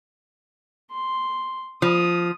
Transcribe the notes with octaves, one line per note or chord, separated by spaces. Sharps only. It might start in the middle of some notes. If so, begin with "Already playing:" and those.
C6
F3 D#6